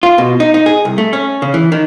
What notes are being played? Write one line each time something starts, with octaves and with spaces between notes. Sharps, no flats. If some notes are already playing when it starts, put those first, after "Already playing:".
F4
B2
D#4
D#4
G#4
C2
A3
C#4
C#3
E3
D#3